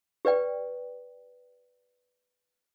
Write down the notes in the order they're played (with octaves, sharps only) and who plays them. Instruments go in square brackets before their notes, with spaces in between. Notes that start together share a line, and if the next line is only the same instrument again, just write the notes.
[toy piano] G4 B4 D5 G5